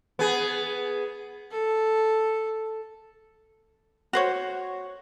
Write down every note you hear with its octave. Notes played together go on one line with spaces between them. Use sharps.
B3 G#4
A4
F#4 C5 C#5